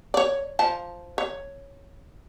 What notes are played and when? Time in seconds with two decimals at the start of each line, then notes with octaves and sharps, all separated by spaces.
0.14 C#5 D5
0.59 F3 A5
1.18 C#5